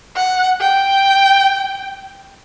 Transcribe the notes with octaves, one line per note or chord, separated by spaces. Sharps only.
F#5
G5